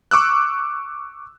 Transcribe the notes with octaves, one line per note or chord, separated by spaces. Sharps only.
C#6 D6 E6 F#6